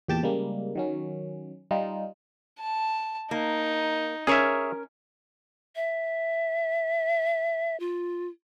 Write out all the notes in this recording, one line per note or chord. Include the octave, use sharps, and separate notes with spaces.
E2 A#2 G4 G5 A5
C#3 G3 G#3 A#3
D#3 F#3 C#4
G3 D#4 F4
A5
A#3 D#4
C#4 G#4 A#4 C#5 E5
E5
F4